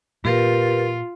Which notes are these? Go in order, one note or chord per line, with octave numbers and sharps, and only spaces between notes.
A#2 F4 G4 A#4 B4